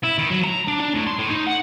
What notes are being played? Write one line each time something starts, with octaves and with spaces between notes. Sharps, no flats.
E4
D#3
F#3
A#5
D4
D4
A2
C6
A2
D#4
F#5